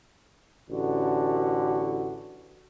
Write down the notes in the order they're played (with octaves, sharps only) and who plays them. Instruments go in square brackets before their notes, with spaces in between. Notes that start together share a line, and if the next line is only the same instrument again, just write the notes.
[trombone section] A1 D3 F#4